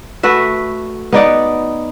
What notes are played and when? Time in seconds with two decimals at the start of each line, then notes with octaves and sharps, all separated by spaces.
0.23 A3 F#4 B4 E5
1.13 B3 D#4 D5 F#5